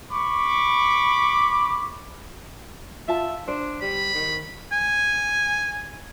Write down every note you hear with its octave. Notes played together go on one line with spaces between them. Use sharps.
B5 C#6 D6
F4 E5 A5
D4 C5
G3 B5
D#3
G#5